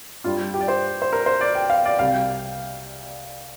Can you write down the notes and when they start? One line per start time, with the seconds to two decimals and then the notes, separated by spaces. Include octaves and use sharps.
0.24 G2 G3 F4
0.54 G4
0.61 D5
0.68 C5
1.02 C5
1.13 A#4
1.26 C5
1.41 D5
1.55 G5
1.70 F5
1.85 D5
1.99 C2 C3 G3 F5